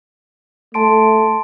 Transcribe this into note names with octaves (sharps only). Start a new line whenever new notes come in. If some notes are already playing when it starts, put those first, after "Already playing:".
A3 A5 C6 D7